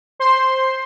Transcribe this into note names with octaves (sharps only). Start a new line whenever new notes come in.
C5 C6